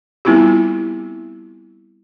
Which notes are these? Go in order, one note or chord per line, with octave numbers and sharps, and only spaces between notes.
G3 B3 C4 E4 F4 G4